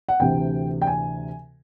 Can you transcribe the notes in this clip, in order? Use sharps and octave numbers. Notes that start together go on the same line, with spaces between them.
F#5
D2 C3 E3 G5
G5
G#5